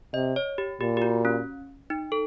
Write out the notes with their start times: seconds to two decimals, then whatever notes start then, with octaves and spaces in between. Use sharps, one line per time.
0.14 C3 D#5
0.36 C#5
0.58 G4
0.81 A#2 G4
0.97 G4
1.02 F#4
1.25 C#4
1.90 D#4
2.12 A4